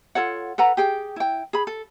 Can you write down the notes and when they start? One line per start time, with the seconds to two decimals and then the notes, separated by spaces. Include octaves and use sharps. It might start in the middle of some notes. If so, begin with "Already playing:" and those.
0.15 F4 A4 C#5 F#5
0.58 A4 B4 F#5 A#5
0.77 G4 G#4 G5
1.16 E4 G5
1.53 G#4 B5
1.67 A4